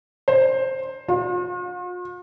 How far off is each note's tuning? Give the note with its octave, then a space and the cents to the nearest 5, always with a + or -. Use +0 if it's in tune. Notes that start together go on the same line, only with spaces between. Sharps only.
C5 +10
F4 +45